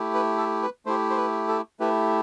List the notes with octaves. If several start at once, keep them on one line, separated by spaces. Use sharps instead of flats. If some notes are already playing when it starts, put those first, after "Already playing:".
Already playing: A3 E4 G4
B4
A4
B4
A3 E4 G4 C5
C5
B4
A4
A3 E4 G4 B4